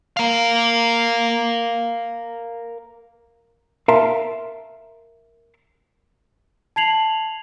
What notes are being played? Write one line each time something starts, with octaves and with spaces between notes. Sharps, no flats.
A#4 F5
A#4 E5 F5 A5 A#5 C6
A5 G#6 C7 F7 F#7